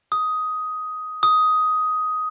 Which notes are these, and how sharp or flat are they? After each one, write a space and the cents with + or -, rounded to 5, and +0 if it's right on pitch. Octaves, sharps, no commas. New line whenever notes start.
D#6 +10
D#6 +10